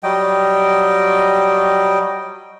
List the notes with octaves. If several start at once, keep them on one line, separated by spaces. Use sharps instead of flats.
F#3 G3 D#5 G5